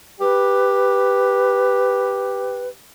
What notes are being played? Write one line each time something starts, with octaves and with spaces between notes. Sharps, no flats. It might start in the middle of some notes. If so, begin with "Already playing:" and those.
G4 B4